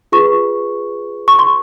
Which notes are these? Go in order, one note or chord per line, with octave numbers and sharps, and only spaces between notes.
F4 G#4 B4 C#6
C#6
C6